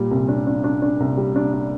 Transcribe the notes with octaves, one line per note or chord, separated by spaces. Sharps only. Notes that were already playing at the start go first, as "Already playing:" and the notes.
Already playing: A#2 G3
C2
D4
D4
D4
D4
C2
G3
D4
D4